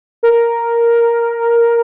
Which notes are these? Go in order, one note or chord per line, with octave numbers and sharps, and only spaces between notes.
A#4